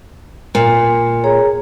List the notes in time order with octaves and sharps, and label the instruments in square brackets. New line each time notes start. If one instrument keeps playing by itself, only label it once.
[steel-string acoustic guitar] A#2
[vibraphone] G#4 C#5 A#5